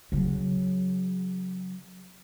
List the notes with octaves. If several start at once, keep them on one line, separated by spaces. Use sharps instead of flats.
C#3 F#3